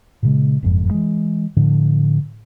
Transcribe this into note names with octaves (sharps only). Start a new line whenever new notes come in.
A#2 C#3 G#3
F#1 F2 G#2
E3 G#3
A2 D3 F3